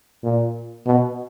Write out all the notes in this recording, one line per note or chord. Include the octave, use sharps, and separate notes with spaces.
A#2
B2